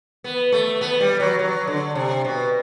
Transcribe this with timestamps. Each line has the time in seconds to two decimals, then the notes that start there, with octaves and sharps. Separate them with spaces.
0.24 B3
0.52 A3
0.81 B3
1.00 G3
1.20 F#3
1.39 F#3
1.67 D3
1.95 C3
2.25 B2